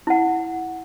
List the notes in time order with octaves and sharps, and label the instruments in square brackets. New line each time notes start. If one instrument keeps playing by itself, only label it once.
[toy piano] E4 F#5